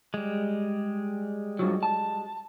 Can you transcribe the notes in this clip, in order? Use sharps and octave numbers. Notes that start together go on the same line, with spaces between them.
G3 G#3
G2 F3 F#3
A5